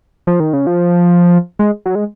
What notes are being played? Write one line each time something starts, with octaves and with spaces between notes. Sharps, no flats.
F3
D#3
C#3
F3
G#3
F#3
G#3